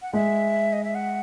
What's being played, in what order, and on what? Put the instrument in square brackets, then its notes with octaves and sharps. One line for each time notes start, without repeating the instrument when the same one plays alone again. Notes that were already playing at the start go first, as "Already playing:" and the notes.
[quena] F#5
[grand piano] G#3 [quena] E5
[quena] D#5
E5
F#5